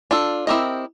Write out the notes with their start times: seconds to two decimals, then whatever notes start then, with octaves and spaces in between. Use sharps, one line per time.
0.11 D4 F4 A4
0.47 C4 E4 G4 A#4 D#5